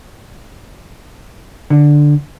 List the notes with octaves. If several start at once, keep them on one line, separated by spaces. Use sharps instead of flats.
D3